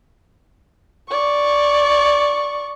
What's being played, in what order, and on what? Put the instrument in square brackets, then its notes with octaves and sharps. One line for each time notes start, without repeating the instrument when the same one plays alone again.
[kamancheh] D5 C#6